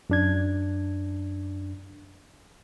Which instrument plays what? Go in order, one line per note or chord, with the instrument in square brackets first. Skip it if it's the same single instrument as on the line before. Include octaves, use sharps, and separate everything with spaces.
[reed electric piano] F#2 D4 G#6